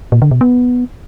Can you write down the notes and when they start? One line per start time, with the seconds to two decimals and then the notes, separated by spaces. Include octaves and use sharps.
0.12 A#2
0.22 D3
0.31 B2
0.41 B3